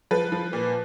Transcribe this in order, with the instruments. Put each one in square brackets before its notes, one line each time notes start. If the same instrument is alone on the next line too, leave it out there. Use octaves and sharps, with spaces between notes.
[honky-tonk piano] F3 B4
F3
A#2